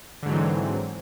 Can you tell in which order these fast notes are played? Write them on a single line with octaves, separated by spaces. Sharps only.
D3 G#2 F#3 E3 C4